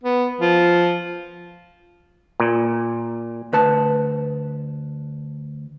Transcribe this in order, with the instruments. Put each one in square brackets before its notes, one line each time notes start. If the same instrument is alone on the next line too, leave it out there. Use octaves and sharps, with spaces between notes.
[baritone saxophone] B3
F3
[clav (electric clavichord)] A#2
[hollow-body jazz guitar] D2 B4 A5